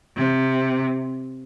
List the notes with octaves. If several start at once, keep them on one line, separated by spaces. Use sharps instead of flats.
C3